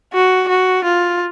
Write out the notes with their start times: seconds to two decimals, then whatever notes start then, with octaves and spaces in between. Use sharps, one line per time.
0.13 F#4
0.48 F#4
0.84 F4